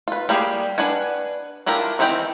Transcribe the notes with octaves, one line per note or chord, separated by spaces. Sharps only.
F4 B4
G3 A#3 G4 G#4
D4 B4 F#5 G#5
D4 E4 F4 G4 A#4
D#3 E3 C4 E4 G5